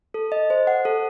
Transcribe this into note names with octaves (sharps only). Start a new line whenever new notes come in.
A4
D#5
C5
F#5
A4